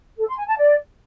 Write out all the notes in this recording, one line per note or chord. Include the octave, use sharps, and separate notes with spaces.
A4
C6
G#5
A5
D5